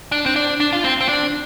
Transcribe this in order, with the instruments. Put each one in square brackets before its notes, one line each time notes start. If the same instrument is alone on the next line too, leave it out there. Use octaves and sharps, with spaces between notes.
[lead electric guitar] D4
C4
D4
D4
F4
C4
C4
D4